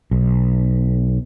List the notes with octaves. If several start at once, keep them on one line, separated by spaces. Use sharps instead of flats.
B1